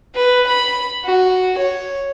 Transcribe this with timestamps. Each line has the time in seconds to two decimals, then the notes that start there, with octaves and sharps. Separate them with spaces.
0.15 B4
0.47 B5
1.05 F#4
1.58 C#5